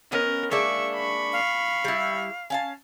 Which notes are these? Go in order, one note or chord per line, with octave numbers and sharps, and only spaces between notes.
B3 C#4 A#4 D#5
G#3 A#3 D4 E5 C#6
B5 C#6
F5
G3 E4
C#4 F5 A5